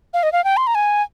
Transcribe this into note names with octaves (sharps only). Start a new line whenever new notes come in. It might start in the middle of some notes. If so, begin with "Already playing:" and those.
F5
D#5
F5
G5
C6
A#5
G#5